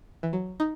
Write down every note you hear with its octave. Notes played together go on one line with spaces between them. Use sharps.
E3
F#3
D#4